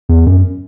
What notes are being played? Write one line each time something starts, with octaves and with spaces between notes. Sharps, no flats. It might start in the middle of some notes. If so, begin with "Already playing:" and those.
E2
F#2